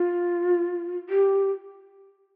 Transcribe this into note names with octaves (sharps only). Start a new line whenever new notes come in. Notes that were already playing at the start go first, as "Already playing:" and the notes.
Already playing: F4
G4